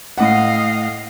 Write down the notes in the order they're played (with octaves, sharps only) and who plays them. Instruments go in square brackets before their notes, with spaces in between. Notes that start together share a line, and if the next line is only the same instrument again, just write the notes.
[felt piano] A2 F#5 [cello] D#5 F5